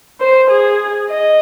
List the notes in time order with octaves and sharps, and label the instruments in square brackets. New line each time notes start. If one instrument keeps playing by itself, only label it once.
[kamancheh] C5
G#4
D#5